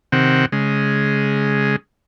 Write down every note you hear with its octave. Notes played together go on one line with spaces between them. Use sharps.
C3 D#3 C4 F#5
C#3 G#3